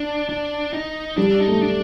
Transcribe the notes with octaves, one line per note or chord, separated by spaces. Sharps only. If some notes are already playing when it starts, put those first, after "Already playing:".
Already playing: D4
D4
D#4
G3 D4
D#4
A3
D4